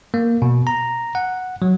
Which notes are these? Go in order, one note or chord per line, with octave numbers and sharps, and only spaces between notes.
A#3
B2
A#5
F#5
F#3